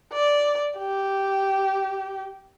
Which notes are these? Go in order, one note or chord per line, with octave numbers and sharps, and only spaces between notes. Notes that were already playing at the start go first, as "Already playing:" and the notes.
D5
G4